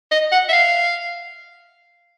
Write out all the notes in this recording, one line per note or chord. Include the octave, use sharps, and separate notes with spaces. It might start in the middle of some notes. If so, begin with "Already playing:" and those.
D#5
F#5
E5
F5